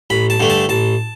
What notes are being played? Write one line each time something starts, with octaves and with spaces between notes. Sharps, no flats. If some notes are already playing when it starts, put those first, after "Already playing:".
A1 B5
A5
G2 D3 A3
A5
A1 A5